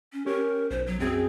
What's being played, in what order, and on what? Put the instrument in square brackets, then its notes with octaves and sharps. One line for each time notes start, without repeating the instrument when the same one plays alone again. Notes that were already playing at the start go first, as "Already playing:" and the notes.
[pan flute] C#4
[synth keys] C#4 G4 [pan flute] A#4
[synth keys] B1 [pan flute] C5
[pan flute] F#3
[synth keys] F#2 G#4 G5 [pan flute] C4